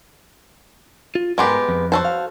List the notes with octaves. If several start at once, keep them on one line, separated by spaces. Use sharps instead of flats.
F4
G#2 G#3 B3 G4 A#4 C6
F2
F#4 A4 C5
F5